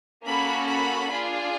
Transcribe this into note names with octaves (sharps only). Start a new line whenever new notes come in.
A#3 C#4 F#4 A4 B5
B5
D4 F4 G#4